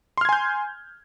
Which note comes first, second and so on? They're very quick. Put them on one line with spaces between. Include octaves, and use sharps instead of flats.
C6 F6 G#6 G#5 G6